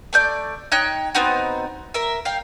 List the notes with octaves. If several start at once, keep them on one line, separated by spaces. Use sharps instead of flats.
A3 D5 G6
D#4 C#5 G5 F#6
B3 C4 D#4 F#4
A#4 E5
F5 G5